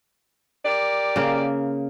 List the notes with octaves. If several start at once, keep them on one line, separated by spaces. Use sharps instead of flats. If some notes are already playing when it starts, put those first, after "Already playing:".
G4 A#4 D5
C#3 A#3